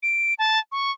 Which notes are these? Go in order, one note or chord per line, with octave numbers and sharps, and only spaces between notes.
D7
A5
C#6